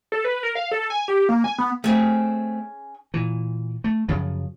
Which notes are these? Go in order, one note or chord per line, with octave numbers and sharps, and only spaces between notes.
A4
B4
A#4
F5
A4
G#5
G4
A#3
G#5
B3
A3 C4 C#4 G#4
A#2 E3
A3
F#2 C#3 F3 F#3